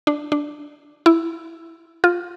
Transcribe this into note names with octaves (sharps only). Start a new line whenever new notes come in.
D4
D4
E4
F4